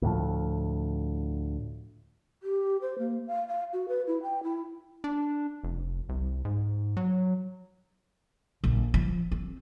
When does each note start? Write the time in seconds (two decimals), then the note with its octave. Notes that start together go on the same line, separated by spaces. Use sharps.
0.02 D2 A2 F3
2.43 G4
2.82 C5
2.99 A#3
3.27 F5
3.48 F5
3.73 F#4
3.88 B4
4.07 E4
4.23 G5
4.43 E4
5.04 D4
5.64 F1
6.09 C2
6.45 G#2
6.97 F#3
8.64 A#1
8.94 F3
9.32 C4